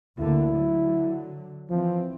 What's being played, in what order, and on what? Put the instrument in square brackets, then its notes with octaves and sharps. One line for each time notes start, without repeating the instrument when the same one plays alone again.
[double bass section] D2 D3 A#3 [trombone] E4
[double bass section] D3 F#3
[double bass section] E3 C4 [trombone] F3